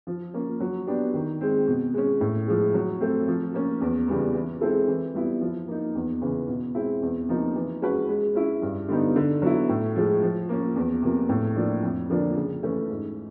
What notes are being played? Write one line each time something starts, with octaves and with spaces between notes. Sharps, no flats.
F3
A#3 C#4
F#3
B3 D4 G4
D#3
G#3 C4
B2
G#3 C#4
A2
F3 G#3
F#3
A3 C4
F3
A#3 C#4
E2
C#3 E3 G3 B3
E3
G#3 C4 E4 A4
E3
G3 B3 E4
F3
A#3 D#4
E2
C#3 E3
B2
G#3 C4 E4
E2
C3 F3 A#3 D#4
E3
G#3 C#4 F#4 B4
G#3
C#4 E4
G2
D3 G3 B3 D#4
D3
F#3 B3 E4
A2
F3 G#3
F3
A#3 C#4
E2
C3 F3 A#3
A2
F3 A#3 D4
F2
D3 F3 A#3 D4
C#3
E3 A3 C#4
G#2